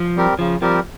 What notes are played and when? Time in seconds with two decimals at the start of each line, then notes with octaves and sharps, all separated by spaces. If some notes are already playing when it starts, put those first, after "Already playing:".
Already playing: F3
0.16 G3 C4 G4 A#4
0.39 C#3 F3
0.61 F3 G3 C4 G4 A#4